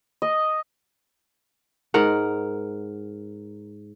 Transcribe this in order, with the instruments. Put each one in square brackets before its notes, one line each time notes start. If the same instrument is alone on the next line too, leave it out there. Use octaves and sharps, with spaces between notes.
[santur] D#5
[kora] G#2 A#4 F#5